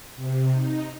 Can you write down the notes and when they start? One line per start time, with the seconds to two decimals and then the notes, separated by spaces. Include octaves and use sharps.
0.16 C3
0.53 D#4